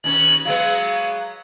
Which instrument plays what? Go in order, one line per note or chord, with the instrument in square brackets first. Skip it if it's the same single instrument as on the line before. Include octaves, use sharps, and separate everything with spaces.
[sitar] D#2 B2 C#4 [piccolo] F#7
[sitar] F#3 G#3 B3 [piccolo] F5